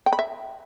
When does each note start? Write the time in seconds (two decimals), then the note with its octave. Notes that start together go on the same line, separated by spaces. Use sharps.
0.06 G5
0.13 B5
0.19 E5